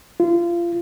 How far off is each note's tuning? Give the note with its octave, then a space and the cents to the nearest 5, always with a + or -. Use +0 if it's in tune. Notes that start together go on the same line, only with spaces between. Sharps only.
F4 -30